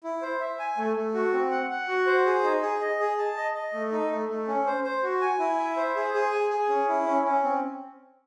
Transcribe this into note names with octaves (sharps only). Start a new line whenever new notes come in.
E4
C5
E5
G#5
A3
A3
F#4
C4
F#5
F#5
F#4
C5
G#4
D#4
G#4
D#5
G#4
A5
D#5
D#5
A3
D#4
A3
A3
C#4
C5
C5
F#4
G#5
E4
E5
C5
G#4
G#4
G#5
G#4
C#4
E4
C#4
C#4
C4